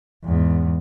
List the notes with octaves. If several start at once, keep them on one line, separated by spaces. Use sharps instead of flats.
E2 G#2